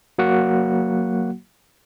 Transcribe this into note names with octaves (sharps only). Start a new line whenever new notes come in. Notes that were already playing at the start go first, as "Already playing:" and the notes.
F#3 A#3 F#4 F#5